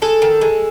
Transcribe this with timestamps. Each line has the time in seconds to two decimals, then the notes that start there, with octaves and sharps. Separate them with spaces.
0.02 G#3 A4
0.22 D#3
0.41 G#3